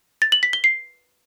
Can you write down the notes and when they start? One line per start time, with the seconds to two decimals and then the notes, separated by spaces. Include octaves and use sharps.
0.22 A6
0.32 F#7
0.43 B6
0.53 G7
0.64 C7